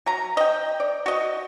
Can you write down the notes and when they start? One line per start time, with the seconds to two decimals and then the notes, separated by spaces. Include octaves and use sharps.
0.06 F#3 A#5
0.37 D#5 G5
0.80 D5
1.06 F#4 D#5